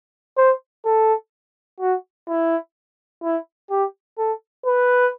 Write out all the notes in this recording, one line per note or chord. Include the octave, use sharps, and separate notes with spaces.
C5
A4
F#4
E4
E4
G4
A4
B4